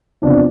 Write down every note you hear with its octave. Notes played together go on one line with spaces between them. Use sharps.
E2 C3 F3 D4